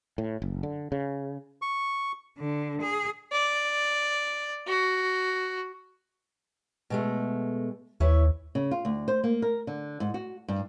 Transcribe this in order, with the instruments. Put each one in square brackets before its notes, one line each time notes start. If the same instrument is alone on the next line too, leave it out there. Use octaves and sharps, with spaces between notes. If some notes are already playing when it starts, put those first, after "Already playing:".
[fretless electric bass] A2
F#1
D3
C#3
[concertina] C#6
[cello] D3
G#4
[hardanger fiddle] D5
F#4
[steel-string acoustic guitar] B2 G#3 A3
[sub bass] D#2 [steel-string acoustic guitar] E3 E4 C#5
[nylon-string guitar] C#3
F4
D2
C5
A#3
A#4
D3
G#2
F#4
G2